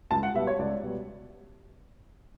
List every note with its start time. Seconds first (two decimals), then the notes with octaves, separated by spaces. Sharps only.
0.11 C#2 A5
0.23 F#5
0.34 B2 G3 B3 E5
0.47 C#5
0.59 C#2 D5
0.82 B2 G3 B3